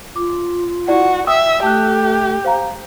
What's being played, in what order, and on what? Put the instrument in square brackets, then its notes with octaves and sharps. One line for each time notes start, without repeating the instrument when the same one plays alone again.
[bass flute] F4 [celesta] D6
[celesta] E4 D5 F#5 [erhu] F#4
[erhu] E5 [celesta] G5 D#6 E6
[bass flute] A3 [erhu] G4 [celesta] A5 F#6
[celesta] C5 F5 A#5